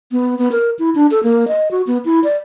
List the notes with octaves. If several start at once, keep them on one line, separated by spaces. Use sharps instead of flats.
B3
B3
A#4
E4
D4
A4
A#3
D#5
F#4
B3
E4
D5